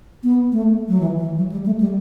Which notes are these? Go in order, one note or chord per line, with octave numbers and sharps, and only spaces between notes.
B3
A3
F#3
E3
E3
F#3
G3
A3
G3